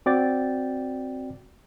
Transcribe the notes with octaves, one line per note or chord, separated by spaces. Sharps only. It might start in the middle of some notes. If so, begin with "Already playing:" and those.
C4 F#4 D5 G5 A6